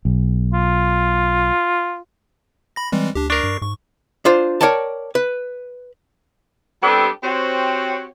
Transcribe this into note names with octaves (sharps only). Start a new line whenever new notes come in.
B1
F4
B5 A#6
E3 G3 G#3 C4
D2 D4 G4
D4 A#4 C#6 C7
G2
G#2 C#6
D4 F4 C5
A#4 C#5 D5 G5 A5
B4
G3 B3 C4 D4 G4 A4
C4 F#4 G4 C5 C#5